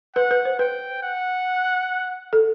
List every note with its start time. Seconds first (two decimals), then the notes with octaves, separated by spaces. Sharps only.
0.16 B4 F#5
0.31 B4
0.45 C5
0.59 B4 G5
1.03 F#5
2.33 A4